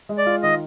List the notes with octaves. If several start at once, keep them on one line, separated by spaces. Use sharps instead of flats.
G#3
D5
F4
D#3 D#5